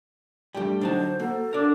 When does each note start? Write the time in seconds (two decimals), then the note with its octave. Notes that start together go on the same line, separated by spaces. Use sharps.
0.55 G2 G3 A3 G4 G5
0.81 D3 F#3 D4 D#4 C5 A5
1.20 A#3 F#4 A4
1.53 D4 A#4 D5